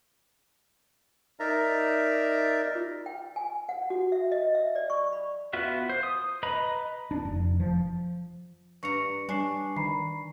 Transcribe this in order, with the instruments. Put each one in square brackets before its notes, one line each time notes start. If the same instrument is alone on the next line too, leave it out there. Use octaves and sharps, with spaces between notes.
[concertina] D#4 A#4 D5 E5 A#5
[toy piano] F4
G5
G#5
F#5
F#4
E5
D#5
E5
D5
C#6
B5
[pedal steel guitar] B3 F4 F#4 E5
C5
D#6
B4 D#5 A#5 B5
[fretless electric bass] D4
F1
F3
[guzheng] G2 A#5 [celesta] C#6 C#7
[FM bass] G3 [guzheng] D4 [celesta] G#5 C#6 C7
[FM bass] D#3 [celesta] A#5 B5 C7